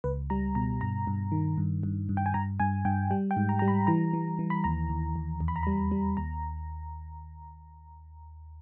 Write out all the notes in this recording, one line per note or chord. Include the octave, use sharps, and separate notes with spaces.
C#2 B4
G3 A#5
B2 A#5
G2 A#5
G2
D#3
G2
G2
G2
G5
G#5
G2 A#5
G2 G#5
G2 G5
G3 G5
G5
G#2
A#5
G3 A#5
B5
E3 A#5
E3
E3
B5
D#2 A#5
D#2
D#2
E2
B5
A#5
G3 B5
G3
D#2 A#5